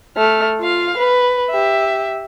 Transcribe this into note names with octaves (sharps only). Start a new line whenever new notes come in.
A3 F6
F4 F5
B4
G4 E5